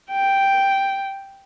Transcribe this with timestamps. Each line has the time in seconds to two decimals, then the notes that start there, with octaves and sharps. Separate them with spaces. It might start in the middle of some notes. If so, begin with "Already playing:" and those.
0.11 G5